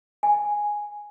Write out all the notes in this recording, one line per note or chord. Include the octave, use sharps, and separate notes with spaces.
G#5